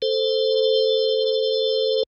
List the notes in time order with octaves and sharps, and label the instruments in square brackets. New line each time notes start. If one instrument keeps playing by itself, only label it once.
[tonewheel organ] A4 C5